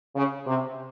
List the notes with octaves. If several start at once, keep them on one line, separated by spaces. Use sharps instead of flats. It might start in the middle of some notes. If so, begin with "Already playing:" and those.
C#3
C3